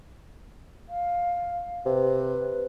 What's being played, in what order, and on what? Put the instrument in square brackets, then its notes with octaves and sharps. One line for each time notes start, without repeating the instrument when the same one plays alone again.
[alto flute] F5
[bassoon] C3 [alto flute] B4